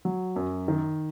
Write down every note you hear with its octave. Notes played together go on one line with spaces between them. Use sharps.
F#3
F#2
D#3